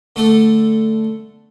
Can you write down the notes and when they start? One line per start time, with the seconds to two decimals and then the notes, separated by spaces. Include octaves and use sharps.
0.16 D3 A3 A4